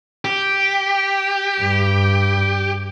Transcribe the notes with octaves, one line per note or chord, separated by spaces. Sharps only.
G4
G2